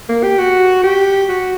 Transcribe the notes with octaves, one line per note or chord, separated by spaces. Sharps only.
A#3
G4
F#4
G4
F#4